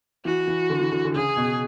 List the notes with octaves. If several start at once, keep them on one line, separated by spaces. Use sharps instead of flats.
E3 F#4
E3
D3
E3
D3
D3
C#3 G#4
B2